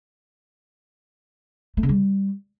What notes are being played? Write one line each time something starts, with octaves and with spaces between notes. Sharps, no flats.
A3
C#3
G3